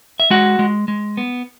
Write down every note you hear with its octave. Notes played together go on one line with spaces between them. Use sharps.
E5
G#3 F#4 F#5
G#3
G#3
B3